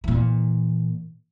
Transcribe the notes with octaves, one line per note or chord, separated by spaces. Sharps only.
A#2 E3